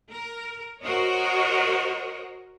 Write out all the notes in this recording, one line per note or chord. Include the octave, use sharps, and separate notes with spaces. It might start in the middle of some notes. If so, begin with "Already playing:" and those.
A#4
F#4 A#4 C5 C#5 D#5